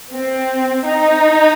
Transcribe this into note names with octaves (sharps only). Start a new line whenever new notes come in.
C4
D#4